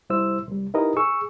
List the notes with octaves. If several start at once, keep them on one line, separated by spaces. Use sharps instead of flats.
C2 G3 E4 C5 E6
C2 G3
D#4 E4 G4 A#4 B4 D#5
G#4 C#6 E6